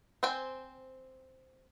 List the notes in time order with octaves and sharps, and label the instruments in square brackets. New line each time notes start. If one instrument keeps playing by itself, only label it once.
[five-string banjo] C4 C5 G5 G#5